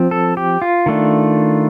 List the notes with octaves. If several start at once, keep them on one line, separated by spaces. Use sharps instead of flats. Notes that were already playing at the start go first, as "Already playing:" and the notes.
Already playing: F3 C4
A4
G4
F4
D#3 A3 D4